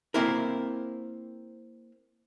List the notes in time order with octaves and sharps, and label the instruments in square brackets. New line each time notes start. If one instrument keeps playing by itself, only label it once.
[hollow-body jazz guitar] A#3 C4 E4 A#4